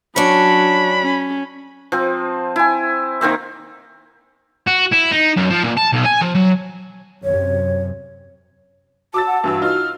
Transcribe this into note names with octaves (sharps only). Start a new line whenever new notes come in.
F#3 C#4 D4 B5
C#4
F3 C4
E4 G#5
D#3 A#3 C4 E5
F#4
E4
D#4
F#2
F3
A#2
A5
B1
G#5
F3
F#3
F#2 C3 C#5
F#4 A5 D6 E6 A6
F#5
G2 E3 F#4 E6
D#4 F4 F6